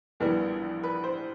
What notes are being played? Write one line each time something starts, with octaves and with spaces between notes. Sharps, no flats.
A#1 A2 E3 G3 B3 A#4
B4
C5